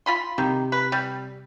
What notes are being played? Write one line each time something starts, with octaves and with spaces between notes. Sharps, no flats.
F4 B5 C6
C3 D#3
B4
G3